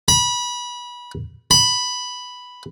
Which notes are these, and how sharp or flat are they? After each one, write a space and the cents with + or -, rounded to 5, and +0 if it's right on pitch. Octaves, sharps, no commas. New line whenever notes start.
B5 -25
B5 +0